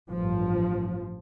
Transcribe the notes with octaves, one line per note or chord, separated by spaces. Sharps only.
A1 G2 F3